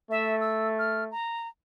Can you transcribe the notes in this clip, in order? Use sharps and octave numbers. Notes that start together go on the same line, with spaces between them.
A3 E5
E6
F6
A#5